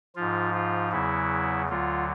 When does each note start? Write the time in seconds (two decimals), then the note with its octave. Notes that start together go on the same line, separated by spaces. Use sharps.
0.15 G#2 F3 F4
0.54 F4
0.92 E2 C#3 F#3 E4
1.69 D2 D3 F#3 F4